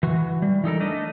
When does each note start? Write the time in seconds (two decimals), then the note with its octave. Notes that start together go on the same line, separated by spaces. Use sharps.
0.03 E3 F#4
0.42 G3
0.64 E3 D#4 A4 A#4
0.80 A3 D4 D#5